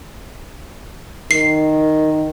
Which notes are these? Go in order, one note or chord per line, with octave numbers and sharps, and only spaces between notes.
D#3 C7